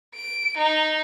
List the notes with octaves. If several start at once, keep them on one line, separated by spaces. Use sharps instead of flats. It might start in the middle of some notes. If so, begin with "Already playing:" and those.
D7
D#4